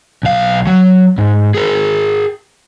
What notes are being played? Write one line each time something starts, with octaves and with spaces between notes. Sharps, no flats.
B1 F5
F#3
G#2
G#4 A#4